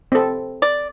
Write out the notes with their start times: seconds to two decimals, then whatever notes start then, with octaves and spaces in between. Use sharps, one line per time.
0.12 C4 A4
0.62 D5